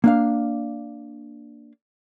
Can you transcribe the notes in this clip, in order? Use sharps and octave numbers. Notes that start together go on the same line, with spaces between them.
A#3 D4 F5